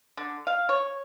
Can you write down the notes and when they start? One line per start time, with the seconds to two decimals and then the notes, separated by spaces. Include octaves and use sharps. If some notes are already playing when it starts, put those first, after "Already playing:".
0.17 D3
0.47 F5
0.69 C#5